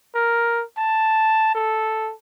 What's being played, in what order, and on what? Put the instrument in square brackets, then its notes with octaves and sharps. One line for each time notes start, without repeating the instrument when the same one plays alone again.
[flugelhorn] A#4
A5
A4